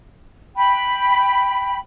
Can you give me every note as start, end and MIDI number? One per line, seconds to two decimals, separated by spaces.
0.56 1.77 79
0.56 1.77 83